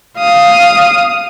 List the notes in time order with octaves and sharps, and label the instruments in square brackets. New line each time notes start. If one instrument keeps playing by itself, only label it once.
[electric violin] F5 D#6